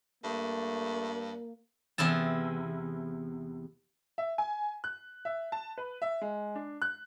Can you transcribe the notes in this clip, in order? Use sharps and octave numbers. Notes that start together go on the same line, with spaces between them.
G2 A3 A#3
E2 C3 E4 A5
E5
G#5
F#6
E5
A5
B4
E5
G#3
D4
F#6